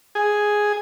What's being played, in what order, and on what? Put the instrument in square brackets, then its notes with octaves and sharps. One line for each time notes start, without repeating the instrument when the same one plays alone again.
[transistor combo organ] G#4